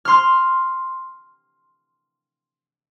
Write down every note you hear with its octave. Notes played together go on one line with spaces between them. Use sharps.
C6 F6